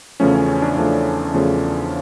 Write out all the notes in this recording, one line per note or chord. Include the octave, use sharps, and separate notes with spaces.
E2 C#3 F3 A3 C#4
C#4
C#4
D4
E2 C#3 F3 A3 D4
E2 C#3 F3 A3